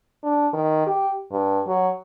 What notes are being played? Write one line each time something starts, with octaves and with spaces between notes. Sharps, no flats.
D4
D#3
G4
G2
F#3